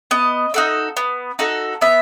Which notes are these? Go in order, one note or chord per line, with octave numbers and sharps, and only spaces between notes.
B3 D#5
D#4 F#4 A4
B3
D#4 F#4 A4
B3 E5